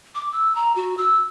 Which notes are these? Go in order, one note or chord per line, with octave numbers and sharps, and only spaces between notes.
D6
E6
A#5
F#4
E6